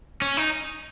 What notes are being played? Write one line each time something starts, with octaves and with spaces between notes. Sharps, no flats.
C#4
D#4